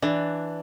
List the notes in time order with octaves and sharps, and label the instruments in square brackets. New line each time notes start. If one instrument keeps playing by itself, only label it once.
[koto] E3 [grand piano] D4 D5